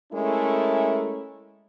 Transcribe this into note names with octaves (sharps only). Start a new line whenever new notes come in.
G#3 A3 C#4 E4 A4 A#4